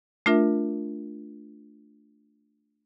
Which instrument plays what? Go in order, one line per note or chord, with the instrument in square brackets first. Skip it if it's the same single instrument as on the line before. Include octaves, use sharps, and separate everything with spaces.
[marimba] A3 D4 F4 A#4 E5